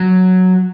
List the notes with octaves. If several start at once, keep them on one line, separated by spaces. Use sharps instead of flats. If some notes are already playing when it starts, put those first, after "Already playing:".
Already playing: F#3